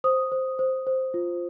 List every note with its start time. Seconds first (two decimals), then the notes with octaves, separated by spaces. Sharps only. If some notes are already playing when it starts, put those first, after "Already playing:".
0.04 C5 D#6
0.32 C5
0.59 C5
0.87 C5
1.14 F4